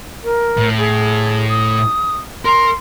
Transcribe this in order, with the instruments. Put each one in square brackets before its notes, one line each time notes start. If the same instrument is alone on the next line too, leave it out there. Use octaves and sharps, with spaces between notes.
[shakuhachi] A#4
[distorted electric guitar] A2
[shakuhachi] G#4
D#6
[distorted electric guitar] A#4 [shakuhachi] C6